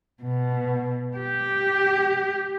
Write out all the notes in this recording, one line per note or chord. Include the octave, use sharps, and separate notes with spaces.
B2
G4